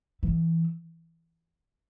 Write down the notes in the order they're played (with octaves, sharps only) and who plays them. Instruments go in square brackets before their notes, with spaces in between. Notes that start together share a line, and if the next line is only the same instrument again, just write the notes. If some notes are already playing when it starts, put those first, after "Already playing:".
[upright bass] E3